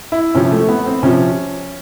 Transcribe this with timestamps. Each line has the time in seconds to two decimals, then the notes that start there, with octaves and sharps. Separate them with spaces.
0.12 E4
0.35 C3 F3 C#4
0.52 A3
0.69 B3
0.86 C4
1.03 C3 F3 C#4